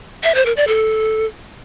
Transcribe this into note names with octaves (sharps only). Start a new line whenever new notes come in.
E5
C5
A#4
D5
A4